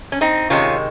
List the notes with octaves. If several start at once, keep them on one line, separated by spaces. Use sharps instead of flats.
C#4
C4 D#4
C3 D#3 G#3 C#4 F4